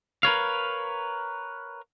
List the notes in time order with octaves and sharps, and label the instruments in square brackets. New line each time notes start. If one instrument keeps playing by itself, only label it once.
[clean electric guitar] A#4 B4 C#5 F5